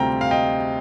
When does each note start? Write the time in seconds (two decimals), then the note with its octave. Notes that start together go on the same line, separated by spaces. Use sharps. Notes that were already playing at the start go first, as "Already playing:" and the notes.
Already playing: D2 C3 G3 C4 F4 G5 A#5
0.21 F5
0.31 D#5 G5